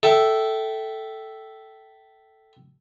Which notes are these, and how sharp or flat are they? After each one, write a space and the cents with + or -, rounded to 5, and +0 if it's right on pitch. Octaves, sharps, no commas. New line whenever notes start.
A4 +0 E5 +0 G5 -20